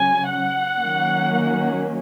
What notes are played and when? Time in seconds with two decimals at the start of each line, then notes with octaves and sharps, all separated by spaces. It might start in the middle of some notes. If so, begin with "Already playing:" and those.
Already playing: C#3 F#3 C#4 G#5
0.28 F#5
0.78 D#3 F#3 A#3 C#4